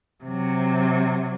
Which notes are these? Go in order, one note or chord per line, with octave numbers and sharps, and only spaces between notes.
C3 F#3